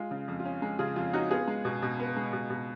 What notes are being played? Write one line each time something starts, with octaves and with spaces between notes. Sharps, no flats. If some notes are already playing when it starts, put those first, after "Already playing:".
Already playing: G#3 F4
C#3
F2
F4
C#4
G#3
C#3 F4 G#4
F2 F4
C#4 D#4 F#4
B3 F4 G#4
G#3
B2
B2
B3
G#3
B2
B2